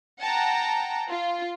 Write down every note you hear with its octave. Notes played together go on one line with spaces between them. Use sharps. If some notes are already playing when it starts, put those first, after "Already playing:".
F#5 G5 A5 A#5
F4